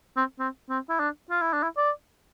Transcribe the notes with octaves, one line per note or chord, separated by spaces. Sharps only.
C4
C4
C4
E4
D4
F4
E4
D4
E4
D5